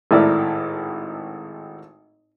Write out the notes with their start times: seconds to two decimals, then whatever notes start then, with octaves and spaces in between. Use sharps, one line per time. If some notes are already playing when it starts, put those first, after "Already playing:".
0.11 G#1 A2 A3 E4 A#4 D5